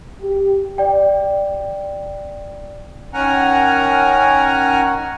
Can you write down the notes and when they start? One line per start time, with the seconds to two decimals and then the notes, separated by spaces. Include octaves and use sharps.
0.20 G4
0.78 D5 G5
3.14 D#3 C#4 A#4 F#5 G#5 A#5